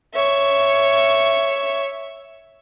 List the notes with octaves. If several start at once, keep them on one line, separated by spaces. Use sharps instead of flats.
C#5 E5